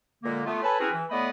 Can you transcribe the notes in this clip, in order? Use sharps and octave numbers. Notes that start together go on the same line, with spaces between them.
A#2 D3 G#3 A#3
A3 B3 F4
A4 B4 C#5 G#5 A5 B5
C4 C#4 E4 F#4 G#4 B4
E3
A2 A3 B3 D5 D#5 B5